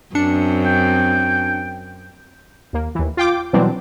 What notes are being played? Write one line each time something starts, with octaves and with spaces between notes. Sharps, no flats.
F#2 C4 D4 C#7
G5
D#2 A#3
D#2 E3
F4 G5 D6
B2 E3 F#3 G3 C4 D4